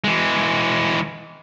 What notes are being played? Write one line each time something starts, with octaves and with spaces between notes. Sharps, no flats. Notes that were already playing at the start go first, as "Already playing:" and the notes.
E3 G#3